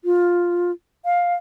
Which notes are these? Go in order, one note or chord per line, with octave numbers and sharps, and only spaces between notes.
F4
F5